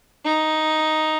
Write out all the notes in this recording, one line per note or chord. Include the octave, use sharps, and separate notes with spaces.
D#4